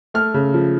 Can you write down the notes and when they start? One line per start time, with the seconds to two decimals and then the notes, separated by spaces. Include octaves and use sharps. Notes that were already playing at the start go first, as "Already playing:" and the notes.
0.14 A3 F6
0.34 C#3
0.54 F3